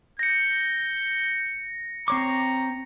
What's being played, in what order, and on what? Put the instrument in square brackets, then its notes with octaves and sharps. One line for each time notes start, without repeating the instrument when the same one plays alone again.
[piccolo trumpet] G6 [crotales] A#6 C#7
[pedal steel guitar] C4 C#5 D6 [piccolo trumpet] A#5